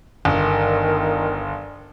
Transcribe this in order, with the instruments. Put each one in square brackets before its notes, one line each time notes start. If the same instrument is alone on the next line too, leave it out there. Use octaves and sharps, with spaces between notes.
[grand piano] G1 [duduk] D#3